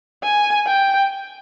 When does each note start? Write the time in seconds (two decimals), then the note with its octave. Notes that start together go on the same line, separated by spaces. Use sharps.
0.23 G#5
0.67 G5